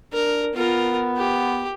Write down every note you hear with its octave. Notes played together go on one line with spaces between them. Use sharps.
D4 A#4
B3 F4 A#4
G4